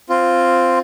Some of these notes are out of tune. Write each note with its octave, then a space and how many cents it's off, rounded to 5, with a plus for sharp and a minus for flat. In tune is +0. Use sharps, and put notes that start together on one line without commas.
C4 +0 F4 +0